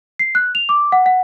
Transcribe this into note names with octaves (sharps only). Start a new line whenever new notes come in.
C7
F#6
F7
D6
F#5
F#5